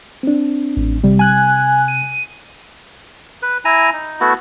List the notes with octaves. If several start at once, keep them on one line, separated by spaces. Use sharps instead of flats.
C4 D4
A1
C3 G3
G#5 F#6 G#6
D#7
B4
E4 G#5 A#5
D#4
A3 B3 E4 F#4